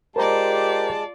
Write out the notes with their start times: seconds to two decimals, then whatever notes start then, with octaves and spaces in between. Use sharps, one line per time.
0.16 G#3 F4 G4 A#4 C5 D5 A5 A#5